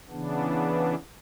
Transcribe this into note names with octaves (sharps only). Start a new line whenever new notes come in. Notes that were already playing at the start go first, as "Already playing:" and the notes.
C#3 E3 B3 D4